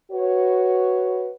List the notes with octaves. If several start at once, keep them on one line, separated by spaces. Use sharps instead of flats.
F#4 B4 C#5